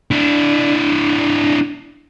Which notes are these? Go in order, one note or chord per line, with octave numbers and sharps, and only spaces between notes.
D4 E4